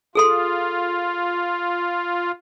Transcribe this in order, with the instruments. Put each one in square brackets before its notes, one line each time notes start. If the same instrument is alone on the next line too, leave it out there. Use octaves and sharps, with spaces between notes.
[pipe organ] F4 [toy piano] G#4 A4 C6